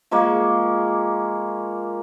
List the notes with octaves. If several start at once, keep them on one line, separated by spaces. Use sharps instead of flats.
F3 G#3 A#3 F#4